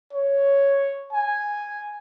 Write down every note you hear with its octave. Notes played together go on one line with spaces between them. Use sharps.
C#5
G#5